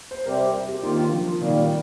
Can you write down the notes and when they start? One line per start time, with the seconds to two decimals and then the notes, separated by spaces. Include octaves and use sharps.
0.11 C5
0.25 C3 G3 C4 G4 A#4
0.54 G4
0.69 G4
0.83 D#3 A#3 D#4 F4
0.97 D4
1.13 F3
1.41 A#2 D#3 G3 A#3